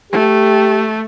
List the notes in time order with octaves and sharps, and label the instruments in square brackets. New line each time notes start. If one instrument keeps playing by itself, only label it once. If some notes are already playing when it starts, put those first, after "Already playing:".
[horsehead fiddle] A3 [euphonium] G4